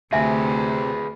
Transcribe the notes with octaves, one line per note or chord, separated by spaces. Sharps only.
D2 C3 G#4 B4 E5 G#5